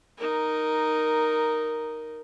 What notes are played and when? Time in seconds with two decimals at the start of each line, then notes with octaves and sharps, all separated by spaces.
0.18 D#4 A#4